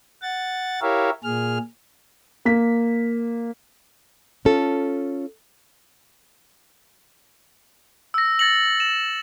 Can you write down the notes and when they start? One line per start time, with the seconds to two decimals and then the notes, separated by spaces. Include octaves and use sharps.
0.22 F#5 A6
0.82 E4 G4 A#4 C#5 E5 F5
1.24 A#2 G#4 F6
2.45 A#3 B6
4.45 C#4 F4 A4
8.14 E6 A#6
8.39 E6 A6 A#6 C#7 F#7
8.80 E7